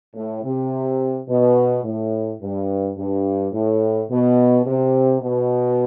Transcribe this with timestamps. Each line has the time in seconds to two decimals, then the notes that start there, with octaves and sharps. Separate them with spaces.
0.15 A2
0.43 C3
1.28 B2
1.83 A2
2.40 G2
2.97 G2
3.52 A2
4.09 B2
4.65 C3
5.21 B2